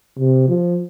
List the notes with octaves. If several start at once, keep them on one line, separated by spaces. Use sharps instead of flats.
C3
F3